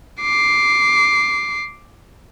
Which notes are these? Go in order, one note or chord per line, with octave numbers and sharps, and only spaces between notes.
D6 C7